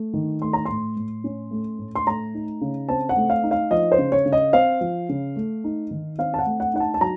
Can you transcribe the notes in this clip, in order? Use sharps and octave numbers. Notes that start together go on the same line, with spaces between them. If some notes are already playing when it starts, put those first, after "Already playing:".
Already playing: A3
D#3
A3 C6
A#5
A2 C6
A2
C#4
A3
A2
C6
A3 A#5
D#4
C#3
C4 A5
F#5
A3
F5
D#4
F5
F3 D#5
C5
C#3
C#5
C#3
D#5
C4 F5
F3
C#3
A3
D#4
D#3
C4 F5
A5
F#5
A3
F#5
D#4 F#5
A5
A5
F#3 A#5